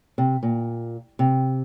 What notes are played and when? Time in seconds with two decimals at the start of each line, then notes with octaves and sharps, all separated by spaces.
0.18 C3
0.43 A#2
1.19 C3